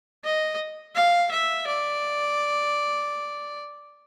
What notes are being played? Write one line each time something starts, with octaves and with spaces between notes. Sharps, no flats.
D#5
F5
E5
D5